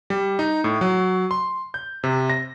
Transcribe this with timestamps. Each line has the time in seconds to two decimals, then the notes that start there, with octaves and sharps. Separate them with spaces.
0.10 G3
0.39 D#4
0.64 A2
0.81 F#3
1.31 C6
1.74 G6
2.04 C3
2.30 A#6